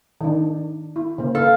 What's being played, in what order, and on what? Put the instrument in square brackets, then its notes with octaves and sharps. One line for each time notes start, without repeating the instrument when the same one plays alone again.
[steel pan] D#3 D4
E4
C#3 A#3 C5
[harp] A4 [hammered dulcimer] F5